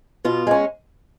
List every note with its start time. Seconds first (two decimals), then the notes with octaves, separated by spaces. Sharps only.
0.25 B2 F4
0.47 G#3 C#4